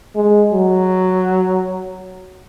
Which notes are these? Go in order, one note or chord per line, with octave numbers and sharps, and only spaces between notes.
G#3
F#3